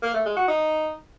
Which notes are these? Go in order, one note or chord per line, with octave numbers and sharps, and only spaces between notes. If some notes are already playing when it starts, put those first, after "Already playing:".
A#3
A3
G#3
F#4
D#4